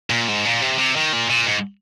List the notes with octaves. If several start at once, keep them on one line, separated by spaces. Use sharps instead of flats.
A#2
G#2
A#2
C3
C3
D#3
A#2
A#2
G#2